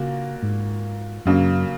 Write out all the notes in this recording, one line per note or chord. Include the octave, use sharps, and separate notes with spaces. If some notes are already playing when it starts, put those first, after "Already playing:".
Already playing: A#2 C#3 A#3 F#4
G#2
F#2 C#3 F#3 A#3